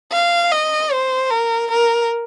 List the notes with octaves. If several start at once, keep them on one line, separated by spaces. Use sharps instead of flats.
F5
D#5
C5
A#4
A#4